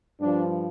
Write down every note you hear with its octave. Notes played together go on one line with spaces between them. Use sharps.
G2 F3 D4